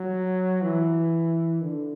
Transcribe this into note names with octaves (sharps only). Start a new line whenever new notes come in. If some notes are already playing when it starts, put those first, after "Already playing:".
Already playing: F#3
E3
D3